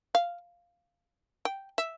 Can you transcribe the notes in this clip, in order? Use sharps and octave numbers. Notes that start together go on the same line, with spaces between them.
F5
G5
E5